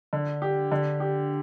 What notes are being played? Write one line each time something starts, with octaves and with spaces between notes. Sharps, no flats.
D3
G4
D3
G4